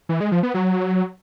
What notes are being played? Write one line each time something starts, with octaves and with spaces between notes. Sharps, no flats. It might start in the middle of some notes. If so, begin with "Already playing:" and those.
E3
G#3
F3
B3
F#3